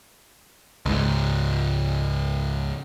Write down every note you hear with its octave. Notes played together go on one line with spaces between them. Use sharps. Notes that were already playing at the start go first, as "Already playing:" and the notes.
C#2 G#2